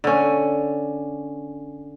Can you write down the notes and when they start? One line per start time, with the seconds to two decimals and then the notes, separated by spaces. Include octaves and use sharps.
0.04 D3 C#4